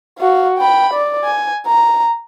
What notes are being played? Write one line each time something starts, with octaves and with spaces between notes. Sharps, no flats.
F#4 F5
G5 B5
D5
G#5
A#5